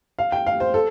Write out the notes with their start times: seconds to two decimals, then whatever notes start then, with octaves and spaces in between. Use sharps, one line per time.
0.19 F5
0.32 G5
0.46 F5
0.60 C5
0.74 A4